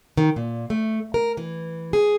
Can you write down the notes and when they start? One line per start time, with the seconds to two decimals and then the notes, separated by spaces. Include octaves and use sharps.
0.17 D#3
0.36 A#2
0.70 A3
1.14 A#4
1.37 E3
1.93 G#4